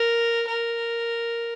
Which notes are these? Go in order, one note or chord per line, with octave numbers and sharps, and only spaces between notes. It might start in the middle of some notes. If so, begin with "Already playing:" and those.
Already playing: A#4
A#4